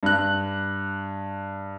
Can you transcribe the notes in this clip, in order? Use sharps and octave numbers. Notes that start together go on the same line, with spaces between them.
G2 F#6